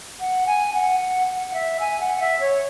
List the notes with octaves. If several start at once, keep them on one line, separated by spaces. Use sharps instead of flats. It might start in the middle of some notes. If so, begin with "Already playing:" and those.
F#5
G#5
F#5
F#5
F#5
E5
G#5
F#5
E5
C#5